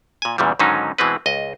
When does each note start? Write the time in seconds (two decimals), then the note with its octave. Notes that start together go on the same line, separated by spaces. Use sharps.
0.22 A#2 G#5
0.38 E2 A#2 C#3 E3 G3
0.59 G#2 D3 D#3 F#3 C#4 D#4
0.98 B2 E3 G#3 C4 B4
1.26 C#2 D#5